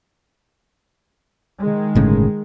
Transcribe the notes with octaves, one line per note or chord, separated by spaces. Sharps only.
D#3 G#3
G1 A2 C#3